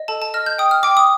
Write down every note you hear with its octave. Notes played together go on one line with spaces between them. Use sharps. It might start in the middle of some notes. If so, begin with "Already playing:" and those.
Already playing: D#5
A4 A5
A5
D#5 F6
G6
G5 D#6
F6
G5 D6
D#6